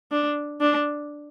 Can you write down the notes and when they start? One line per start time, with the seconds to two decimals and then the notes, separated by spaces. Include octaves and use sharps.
0.11 D4
0.61 D4